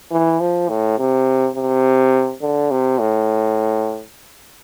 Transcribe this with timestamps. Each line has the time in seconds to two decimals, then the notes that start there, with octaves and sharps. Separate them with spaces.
0.11 E3
0.41 F3
0.69 A2
0.98 C3
1.56 C3
2.42 D3
2.71 C3
2.99 A2